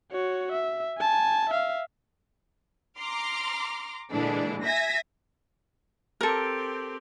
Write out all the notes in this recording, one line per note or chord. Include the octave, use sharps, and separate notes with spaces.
F#4 C#5
E5
G#5 A5
E5 F5
A#5 C6 D6 F6
A#2 D3 E3 G#3 D4
E5 G#5 G#6 A#6 B6
C4 G4 A4 A#4